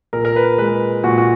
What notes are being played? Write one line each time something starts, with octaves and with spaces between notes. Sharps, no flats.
A#2 A#4
A#4
B4
G#3 B4
A#2 F#4
F#4